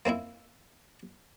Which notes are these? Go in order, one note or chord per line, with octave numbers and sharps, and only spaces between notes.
A#3 C4 D#4 E4